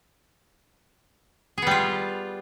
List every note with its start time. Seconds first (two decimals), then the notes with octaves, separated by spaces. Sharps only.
1.58 G#4
1.62 B3
1.67 G3
1.71 F4